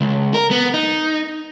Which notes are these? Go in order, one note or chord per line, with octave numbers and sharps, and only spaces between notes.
C#2
A#4
B3
D#4